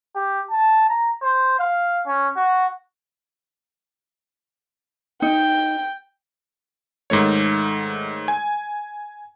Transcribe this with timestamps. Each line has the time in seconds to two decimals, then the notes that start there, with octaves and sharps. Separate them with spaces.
0.15 G4
0.50 A5
0.89 A#5
1.22 C5
1.59 F5
2.06 C#4
2.36 F#4
5.22 D#4 G5
7.10 G#2 D#3 A3 C#5
8.28 G#5